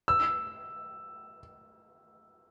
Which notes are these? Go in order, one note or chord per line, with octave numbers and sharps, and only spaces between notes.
E6